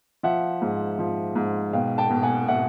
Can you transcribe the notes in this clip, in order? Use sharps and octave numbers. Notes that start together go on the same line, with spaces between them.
F3 E5 F#5
G#2
F3
G#2
B2 F5 G5
G5 A5
B2
F#5 G#5
B2 E5 F#5